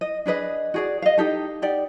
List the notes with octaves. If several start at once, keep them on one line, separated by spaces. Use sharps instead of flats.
D#5
D4 G#4 B4 D#5
F#4 G#4 D5
D#5 F5
D#4 G4 A4
D#4 G4 D5 F#5